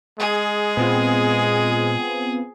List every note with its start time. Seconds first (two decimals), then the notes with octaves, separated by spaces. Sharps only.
0.19 G#3 G#4
0.77 A#2 B3 C4 F4